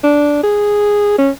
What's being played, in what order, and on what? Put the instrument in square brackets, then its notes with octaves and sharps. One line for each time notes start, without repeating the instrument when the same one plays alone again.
[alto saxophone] D4
G#4
C#4